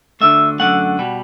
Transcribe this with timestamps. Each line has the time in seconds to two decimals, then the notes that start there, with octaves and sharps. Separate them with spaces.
0.21 D2 D3 A3 E5
0.59 F#2 D3 A3 F#5
0.99 B2 G3